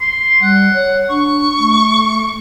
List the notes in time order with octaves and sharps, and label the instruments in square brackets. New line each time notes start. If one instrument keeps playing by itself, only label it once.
[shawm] C6
[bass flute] G3 [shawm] F#5
[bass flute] C#5
[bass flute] D4 [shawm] C#6
[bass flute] A3